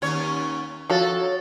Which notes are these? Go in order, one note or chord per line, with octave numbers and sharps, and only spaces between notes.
D#2 C#4 C#5
F3 F#4 A4 C#5